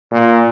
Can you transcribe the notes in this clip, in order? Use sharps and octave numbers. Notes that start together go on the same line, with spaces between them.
A#2